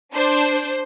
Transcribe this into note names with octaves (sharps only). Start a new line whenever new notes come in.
D4 C5